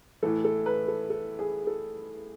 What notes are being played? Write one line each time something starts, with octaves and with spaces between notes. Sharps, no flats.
A2 E3 A4
A4
B4
A4
A4
G#4
A4